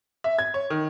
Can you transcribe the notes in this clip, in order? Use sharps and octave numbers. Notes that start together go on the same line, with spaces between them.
E5
G#6
C#5
D#3